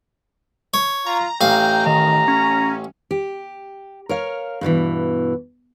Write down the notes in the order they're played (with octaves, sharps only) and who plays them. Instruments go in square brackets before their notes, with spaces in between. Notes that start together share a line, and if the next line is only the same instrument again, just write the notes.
[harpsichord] C#5
[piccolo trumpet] F4 [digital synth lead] A#5
[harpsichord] A1 F5 [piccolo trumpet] G5
[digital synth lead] D#3 [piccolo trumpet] A#5
[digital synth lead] C#4
[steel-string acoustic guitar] G4
A#4 C#5 F5
G2 B2 D3 E3